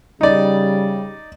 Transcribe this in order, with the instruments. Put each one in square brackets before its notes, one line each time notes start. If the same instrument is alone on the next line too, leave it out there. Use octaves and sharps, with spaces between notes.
[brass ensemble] C#3 G3 [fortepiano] D#4 D5